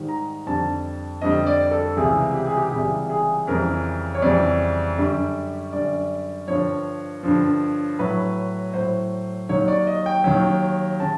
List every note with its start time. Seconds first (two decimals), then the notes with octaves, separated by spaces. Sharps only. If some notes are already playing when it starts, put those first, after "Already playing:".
Already playing: G#2 D#3 G3
0.09 A#5
0.46 F2 D3 G3 A5
1.22 F2 D3 G3 D#5
1.47 D5
1.71 A4
1.97 C#2 C3 E3 G3 G#4
2.34 G4
2.47 G#4
2.57 G4
2.72 C#2 C3 E3 G3 G#4
3.10 G#4
3.47 F2 C#3 E3 G3 A#4
4.15 C#5
4.22 F2 C#3 E3 G3 D5
4.97 F#2 D3 G3
5.73 F#2 D3 G3 D5
6.48 G2 D3 F3 C#5
7.23 G2 D3 F3
7.99 A2 F#3 B4
8.74 A2 F#3 C5
9.49 D#2 D#3 F#3 C#5
9.68 D5
9.87 D#5
10.06 G5
10.24 D#2 D#3 F#3
11.00 C#3 A5